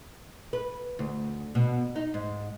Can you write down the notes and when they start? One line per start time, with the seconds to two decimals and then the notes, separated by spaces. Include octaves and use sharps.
0.53 B4
0.99 D2
1.55 B2
1.96 D#4
2.14 G#2